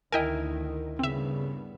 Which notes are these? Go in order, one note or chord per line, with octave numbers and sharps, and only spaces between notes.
D2 D#3 E4 A#4 D#5 G5 G#5
G2 C#3 B3 C4 E5